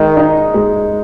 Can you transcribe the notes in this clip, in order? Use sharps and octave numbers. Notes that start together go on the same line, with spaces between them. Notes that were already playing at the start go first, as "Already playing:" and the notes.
Already playing: D#3 G#3 D#4
D#4
G#3